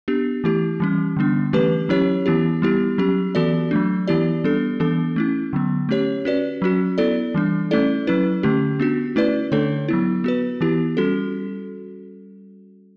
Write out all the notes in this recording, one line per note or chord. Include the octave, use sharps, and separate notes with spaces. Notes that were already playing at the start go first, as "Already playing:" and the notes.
B3 D4 G4
E3 A3 E4 G4
E3 G3 C#4
D3 G3 B3 D4
E3 A3 C#4 G4 B4
F#3 C#4 E4 G4 C#5
E3 B3 E4 G4
G3 B3 E4 G4
F#3 C#4 G4
E3 B3 F#4 A4 D5
F#3 A3 D4
E3 B3 E4 G4 D5
G3 B3 D4 A4
E3 B3 D4 A4
A3 C#4 E4
D3 F#3 B3
A3 C#4 G4 C#5
C#4 F#4 B4 D5
F#3 C#4 F#4
B3 E4 A4 D5
E3 G3 D4
A3 C#4 E4 A4 D5
F#3 C#4 E4 B4
D3 A3 C#4 G4
B3 D4 F#4
A3 C#4 E4 B4 D5
D3 A3 D4 A4 C#5
F#3 B3 E4
B3 F#4 B4
E3 B3 E4 G4
G3 C#4 F#4 A4